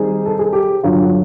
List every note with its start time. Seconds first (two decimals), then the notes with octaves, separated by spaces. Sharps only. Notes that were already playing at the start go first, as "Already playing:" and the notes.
Already playing: D#3 G3 C4 D#4 G#4
0.26 A4
0.39 G#4
0.53 G4
0.83 G2 D3 F#3 F4
1.04 F#4